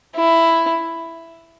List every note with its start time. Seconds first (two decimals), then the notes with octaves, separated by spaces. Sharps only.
0.15 E4